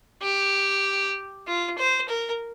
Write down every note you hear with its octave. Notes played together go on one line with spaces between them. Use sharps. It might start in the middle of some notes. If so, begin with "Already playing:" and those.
G4
F4
C5
A#4